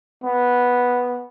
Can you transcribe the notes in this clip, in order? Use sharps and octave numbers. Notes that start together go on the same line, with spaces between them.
B3